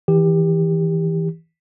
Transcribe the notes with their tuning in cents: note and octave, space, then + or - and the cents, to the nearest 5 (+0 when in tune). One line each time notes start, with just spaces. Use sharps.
E3 -20 G4 +20